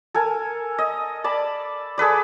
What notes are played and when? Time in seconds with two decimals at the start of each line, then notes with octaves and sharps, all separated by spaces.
0.14 A4 A#4 G#5
0.78 D#5
1.24 D5 A5 B5
1.98 G#4 A4 B4 D5